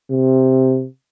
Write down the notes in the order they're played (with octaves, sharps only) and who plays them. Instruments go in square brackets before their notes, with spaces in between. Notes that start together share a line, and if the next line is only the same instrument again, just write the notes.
[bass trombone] C3